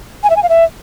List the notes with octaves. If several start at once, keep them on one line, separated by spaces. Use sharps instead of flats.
G#5
E5
G#5
F5
E5